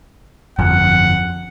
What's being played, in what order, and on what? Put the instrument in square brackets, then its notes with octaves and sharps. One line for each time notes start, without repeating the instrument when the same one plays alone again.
[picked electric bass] G1 F2 [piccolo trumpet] F#5